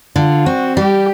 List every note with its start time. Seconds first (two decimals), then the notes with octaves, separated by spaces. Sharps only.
0.16 D3 F4
0.45 C4 F#4
0.77 G3 G4